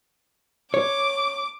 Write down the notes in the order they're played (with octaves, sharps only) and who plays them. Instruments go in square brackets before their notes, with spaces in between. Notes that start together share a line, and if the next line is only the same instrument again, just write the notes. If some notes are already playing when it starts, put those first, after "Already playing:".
[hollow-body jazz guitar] C#5 [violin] D6